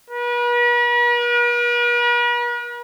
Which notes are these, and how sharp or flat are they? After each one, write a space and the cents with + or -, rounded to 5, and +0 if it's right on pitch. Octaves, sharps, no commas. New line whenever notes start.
B4 -45